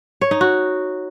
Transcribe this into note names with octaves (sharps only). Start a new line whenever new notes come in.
C#5
D#4
F#4